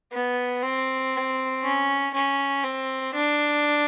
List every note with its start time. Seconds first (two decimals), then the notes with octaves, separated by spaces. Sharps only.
0.12 B3
0.62 C4
1.62 C#4
2.13 C#4
2.64 C4
3.14 D4